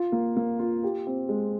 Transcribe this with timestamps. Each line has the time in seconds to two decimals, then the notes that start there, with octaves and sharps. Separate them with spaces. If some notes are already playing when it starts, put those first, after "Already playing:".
Already playing: F4
0.12 A#3
0.36 A#3
0.59 F4
0.83 G4
1.07 C4
1.29 G#3